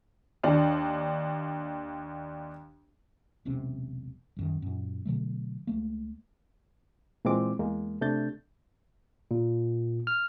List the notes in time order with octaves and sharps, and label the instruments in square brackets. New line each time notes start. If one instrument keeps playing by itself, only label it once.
[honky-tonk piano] D#2 D4
[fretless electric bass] E1 B1 C3 C#4
C2 F#2 D#3
F#2 A#2
B2 D3 F#3 A3
C#2 A3 A#3
[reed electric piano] A#2 E3 G#3 C4 D6
E2 G#3 A#3
C3 A3 D4 G6 A6
[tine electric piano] A#2
F6